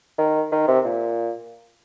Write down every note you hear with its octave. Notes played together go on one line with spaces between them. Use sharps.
D#3
D#3
C3
A#2